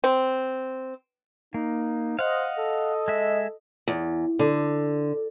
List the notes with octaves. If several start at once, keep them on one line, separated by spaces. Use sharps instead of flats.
C4
A#3 D#4
C5 D#5 F5 F#5
A4
G#3 E5
E2
D3